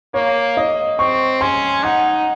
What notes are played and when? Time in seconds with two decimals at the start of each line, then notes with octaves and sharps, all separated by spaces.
0.14 A#3 C#5
0.57 D#5
0.99 C4 C#6
1.41 C#4 C6
1.83 D#4 F#5